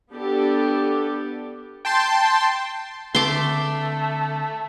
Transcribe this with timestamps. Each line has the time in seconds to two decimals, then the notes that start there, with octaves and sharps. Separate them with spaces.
0.13 B3 D4 G4 A4
1.85 G5 A5 C6
3.15 D3 A3 C4 C6 D6